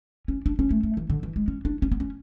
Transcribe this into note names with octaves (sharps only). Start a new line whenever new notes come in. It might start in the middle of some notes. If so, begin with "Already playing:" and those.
C#4
D4
C#4
A3
A3
E3
D3
E3
G#3
C#4
D4
C#4
B3
C#4